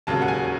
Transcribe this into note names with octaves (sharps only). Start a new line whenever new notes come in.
E1 D#2 C#3 F#3 A5
F#5
G#5